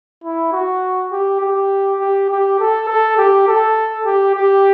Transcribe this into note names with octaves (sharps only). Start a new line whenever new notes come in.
E4
F#4
G4
G4
G4
G4
A4
A4
G4
A4
G4
G4